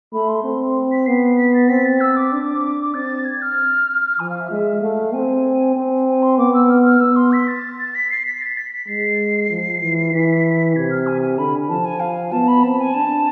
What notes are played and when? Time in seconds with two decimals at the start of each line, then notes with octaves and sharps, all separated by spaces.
0.13 A3 B5
0.29 C6
0.44 C4
0.92 B6
1.06 B3 C7
1.38 B6
1.54 A6
1.69 C4 B6
1.85 A6
2.01 E6
2.16 D6
2.32 D4
2.94 C4 A6
3.25 G#6
3.42 F6
4.19 F3 G#5
4.29 F5
4.40 E5
4.50 G#3 E5
4.81 A3 F5
5.13 C4 G#5
5.76 C4
6.07 G#5
6.23 C6
6.38 B3 D6
6.54 E6
6.70 F6
6.85 F6
7.00 B3 E6
7.16 C6
7.32 B6
7.48 A6
7.95 B6
8.10 C7
8.26 B6
8.42 A6
8.57 B6
8.72 B6
8.88 G#3 C7
9.50 F3
9.82 E3
10.12 E3 B6
10.76 C3 G#6
10.90 F6
11.07 G#5
11.22 G#5
11.38 D3 B5
11.69 F3 A5
11.85 G#5
12.00 F5
12.32 B3 A5
12.48 B5
12.63 C4 A5
12.79 G#5
12.94 D4 A5